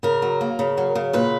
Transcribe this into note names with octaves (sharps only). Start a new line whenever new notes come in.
C#3 A#4
F#3
A#3
C#3
F#3
C#3
A#2 B4